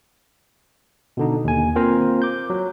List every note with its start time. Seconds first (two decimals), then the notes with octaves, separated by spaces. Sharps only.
1.17 B2 D3 D#4
1.45 D#2 G#5
1.75 A#3 C4 F4 A#4 C5 A#5
2.22 D6 G6
2.50 F#3